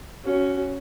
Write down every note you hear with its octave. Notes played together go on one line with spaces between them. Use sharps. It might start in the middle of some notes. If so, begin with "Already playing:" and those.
C#4 F#4